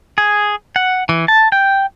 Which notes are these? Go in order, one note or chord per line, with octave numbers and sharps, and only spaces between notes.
G#4
F#5
E3
A5
G5